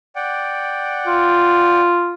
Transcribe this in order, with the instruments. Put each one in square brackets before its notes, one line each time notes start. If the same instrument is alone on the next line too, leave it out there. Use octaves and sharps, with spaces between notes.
[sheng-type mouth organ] D5 F#5 G5
[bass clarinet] F4